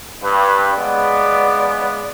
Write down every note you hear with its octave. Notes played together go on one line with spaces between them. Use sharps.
G2 B4
C#3 G#3 B3 D5